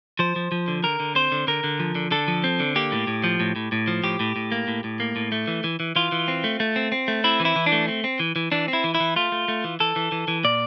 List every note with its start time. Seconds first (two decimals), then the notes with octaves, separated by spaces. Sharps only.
0.19 F3 C5
0.36 F3
0.52 F3
0.68 D3
0.83 D3 A#4
1.00 D3
1.15 C4 C5
1.32 D3
1.47 D3 A#4
1.64 D3
1.80 F3
1.95 D3
2.11 D3 A4
2.28 F3
2.44 C4
2.60 D3
2.76 A#3 G4
2.92 A2
3.07 A2
3.24 F3
3.40 A2
3.56 A2
3.72 A2
3.88 F3
4.03 A2 G4
4.20 A2
4.36 A2
4.52 A#3
4.68 A2
4.84 A2
5.00 A#3
5.16 A2
5.32 A3
5.48 E3
5.64 E3
5.80 E3
5.96 E3 F4
6.12 E3
6.28 C4
6.44 A3
6.60 A3
6.76 C4
6.92 C4
7.08 A3
7.24 C4 E4
7.40 E3
7.45 E4
7.56 E3
7.66 D4
7.72 A3
7.88 C4
8.04 C4
8.20 E3
8.36 E3
8.52 E3 D4
8.68 C4
8.73 E4
8.84 E3
8.95 E4
9.00 E3
9.16 A3 F4
9.32 A3
9.48 A3
9.64 E3
9.80 E3 A4
9.96 E3
10.12 E3
10.28 E3
10.44 A#2 D5